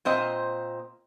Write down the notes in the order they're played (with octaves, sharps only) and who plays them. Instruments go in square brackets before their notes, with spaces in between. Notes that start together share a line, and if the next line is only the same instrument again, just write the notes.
[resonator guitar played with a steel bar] A#2 C4 C5 D#5